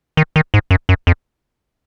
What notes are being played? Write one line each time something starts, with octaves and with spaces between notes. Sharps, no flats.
D#3
D#3
G#2
F#2
F#2
F2